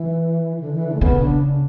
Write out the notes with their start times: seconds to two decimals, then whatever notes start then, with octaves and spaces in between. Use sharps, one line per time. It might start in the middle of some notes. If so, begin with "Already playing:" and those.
Already playing: E3
0.60 D3
0.74 E3
0.87 D3
0.95 A3
1.01 C#3 B3
1.21 D4